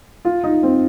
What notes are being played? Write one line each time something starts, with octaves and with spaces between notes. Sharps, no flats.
F4
D#4
C4